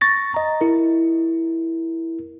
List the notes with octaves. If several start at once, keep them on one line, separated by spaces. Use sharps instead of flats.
C#6 A6 A#6
D#5 A#5
E4 A#4